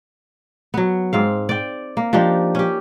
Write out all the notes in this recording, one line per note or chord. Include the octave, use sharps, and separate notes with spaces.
F#3 B3
G#2 C4 F5
D5 G5
A#3
F3 D4 D#4 G4
C#4 G4